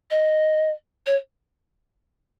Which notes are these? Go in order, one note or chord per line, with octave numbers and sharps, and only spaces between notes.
D#5
C#5